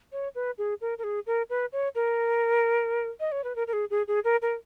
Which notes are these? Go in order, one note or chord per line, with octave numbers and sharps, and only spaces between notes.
C#5
B4
G#4
A#4
A#4
G#4
A#4
B4
C#5
A#4
D#5
C#5
B4
A#4
A#4
G#4
G#4
G#4
A#4
A#4